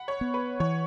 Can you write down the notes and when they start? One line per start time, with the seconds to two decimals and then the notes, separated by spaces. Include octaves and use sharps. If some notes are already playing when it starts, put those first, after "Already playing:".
Already playing: F#5 B5
0.08 C#5
0.21 B3
0.34 B4
0.60 E3 C#5